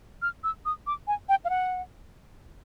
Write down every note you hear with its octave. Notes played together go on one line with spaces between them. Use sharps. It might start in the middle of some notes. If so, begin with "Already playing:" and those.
F6
E6
D#6
D6
G#5
G5
F5
F#5